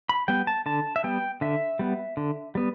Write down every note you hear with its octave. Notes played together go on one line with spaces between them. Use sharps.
B5
G3 B3 G5
A5
D3 A5
E5
G3 B3 G5
D3 E5
G3 B3
D3
G3 B3